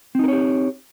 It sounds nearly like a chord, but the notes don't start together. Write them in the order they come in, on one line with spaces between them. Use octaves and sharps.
C4 D#4 A#4 C#5 G4